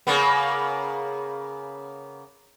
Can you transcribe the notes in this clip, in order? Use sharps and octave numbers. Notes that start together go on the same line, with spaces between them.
C#3 A#3 B3